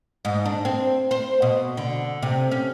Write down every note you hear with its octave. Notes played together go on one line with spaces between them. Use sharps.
G#2
D4
C4
C5
B2
D3
C3
C#4